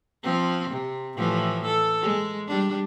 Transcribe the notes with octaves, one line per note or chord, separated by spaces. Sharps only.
F3 C4
C3
A2 E3 F3
A4
G#3
G3 D4